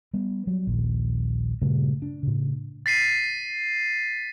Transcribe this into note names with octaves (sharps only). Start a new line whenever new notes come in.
G3 B3
F#3 G3
A#1 D#2
G2 A#2 C#3 A3
D4
A2 C#3
A6 B6 C7 D#7